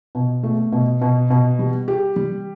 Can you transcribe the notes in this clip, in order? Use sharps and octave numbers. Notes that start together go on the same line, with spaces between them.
B2
A3
B2
B2
B2
G3
G4
G3